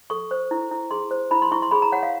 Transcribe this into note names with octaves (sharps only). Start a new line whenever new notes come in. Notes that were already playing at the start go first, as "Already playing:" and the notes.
A4 C#6
C5
E4
E4
G#4 C6
C5
E4 B5
C6
E4 C#6
C6
G#4 B5
A#5
C#5 F#5
F5